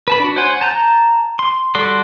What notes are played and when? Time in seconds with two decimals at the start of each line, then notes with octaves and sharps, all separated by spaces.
0.08 B4 A5 B5
0.20 D4 F#4
0.36 C5 C#5 F#5 G#5 C6
0.61 A5 A#5 G6
1.39 C6
1.75 G3 F#4 A4 D5 C6